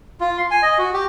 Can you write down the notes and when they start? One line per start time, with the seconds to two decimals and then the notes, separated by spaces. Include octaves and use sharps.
0.20 F4
0.38 C6
0.51 G#5
0.62 D#5
0.78 F#4
0.93 G4